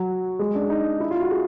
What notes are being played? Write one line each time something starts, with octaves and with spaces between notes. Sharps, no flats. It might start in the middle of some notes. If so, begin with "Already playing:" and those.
Already playing: F#3
G#3
D4
D#4
E4
F4
F#4
G#4